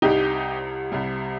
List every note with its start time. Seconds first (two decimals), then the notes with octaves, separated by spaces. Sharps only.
0.02 C2 C3 G3 D#4 G4
0.92 C2 C3 G3